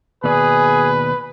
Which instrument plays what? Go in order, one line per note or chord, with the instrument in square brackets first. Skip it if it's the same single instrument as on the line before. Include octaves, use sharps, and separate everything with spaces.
[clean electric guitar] D#2 B2 D5 [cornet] G#4 [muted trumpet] B4